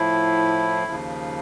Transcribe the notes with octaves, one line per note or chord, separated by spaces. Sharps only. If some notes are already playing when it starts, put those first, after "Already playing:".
Already playing: A2 F3 E4
D#2 C#3 F3